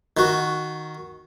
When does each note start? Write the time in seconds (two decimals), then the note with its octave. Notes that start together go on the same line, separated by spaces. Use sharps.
0.17 D#3 F#4